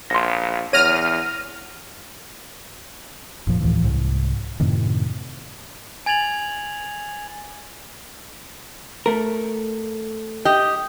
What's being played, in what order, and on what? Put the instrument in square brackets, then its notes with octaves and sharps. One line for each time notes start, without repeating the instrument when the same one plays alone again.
[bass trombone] A#1 [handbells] C6 A#6
[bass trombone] E2 [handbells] C#5 [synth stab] F6 A#6 D#7
[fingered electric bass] F1 A#2 F3
D2 A2 E3 F3
C2 G#2
F#2 A2 C3 D#3
[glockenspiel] G#5 G#6 A6 F7 F#7
[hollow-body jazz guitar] A3 A#4
[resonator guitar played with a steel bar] G4 D#5